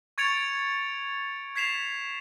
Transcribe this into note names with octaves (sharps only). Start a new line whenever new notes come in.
C#6 G#6 A6 C#7 D7 F7
G#6 B6 C7 E7 F7